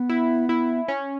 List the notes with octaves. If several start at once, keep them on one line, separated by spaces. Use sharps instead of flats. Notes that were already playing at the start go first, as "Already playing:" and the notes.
Already playing: B3
E4
E4
C#4